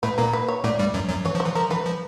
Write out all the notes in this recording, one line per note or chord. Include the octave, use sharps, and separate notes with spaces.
A2 A3 B4
A#2 A#3 A#4
B4
C#5
A2 A3 D5
G2 G3
F#2 F#3
F#2 F#3
E3 C#5
F3
C5
E3
F3 A#4
E3 B4
F3